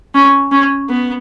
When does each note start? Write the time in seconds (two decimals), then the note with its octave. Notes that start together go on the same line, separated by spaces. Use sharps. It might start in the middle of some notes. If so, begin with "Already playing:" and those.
0.14 C#4
0.52 C#4
0.89 B3